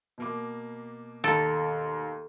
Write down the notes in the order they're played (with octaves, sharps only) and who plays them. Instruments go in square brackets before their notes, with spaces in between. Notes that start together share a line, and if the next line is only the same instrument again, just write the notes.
[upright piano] B2 A#3 D6
[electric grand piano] D#2 A#5 [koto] A4